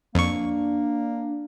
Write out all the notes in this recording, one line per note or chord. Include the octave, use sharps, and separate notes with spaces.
F2 A#3 D4 C#6